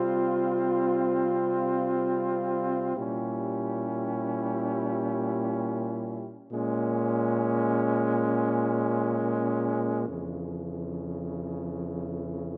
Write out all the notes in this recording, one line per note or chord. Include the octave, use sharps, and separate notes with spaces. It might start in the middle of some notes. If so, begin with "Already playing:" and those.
Already playing: C3 G3 C4 F4
A#2 G3 C#4 E4 G4
A#2 G#3 C#4
F2 C#3 E3